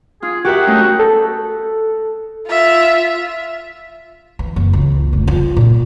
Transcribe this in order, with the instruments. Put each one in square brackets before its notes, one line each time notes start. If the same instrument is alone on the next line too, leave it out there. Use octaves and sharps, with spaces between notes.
[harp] F4 [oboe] G#4
[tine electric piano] F#4 [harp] G4 A#4 E5 [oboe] F#5
[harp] A3 C#4 [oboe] D#4
[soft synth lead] A4
[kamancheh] F4 E5
[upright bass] E3
F#1
C#2
F1
F4
A#2